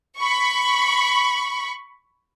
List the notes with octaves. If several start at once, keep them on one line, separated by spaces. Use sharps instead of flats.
B5 C#6